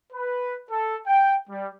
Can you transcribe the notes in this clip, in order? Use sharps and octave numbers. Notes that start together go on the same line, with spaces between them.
B4
A4
G5
G3